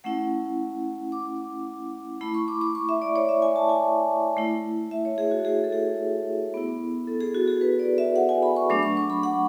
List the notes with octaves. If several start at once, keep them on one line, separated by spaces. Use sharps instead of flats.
A3 C#4 E4 F#5
D6
A3 E4 B5
C#6
D6
D6
C#6
E5
D5
C#5
E5
G#5
A5
G#5
A3 E4
E5
C#5
G#4
F#4
G#4
A4
G#4
B3 E4
A4
G#4
F#4
G#4
B4
D5
E5
F#5
G#5
B5
C#6
F#3 A3 D4 D6
C#6
C#6
B5
F#5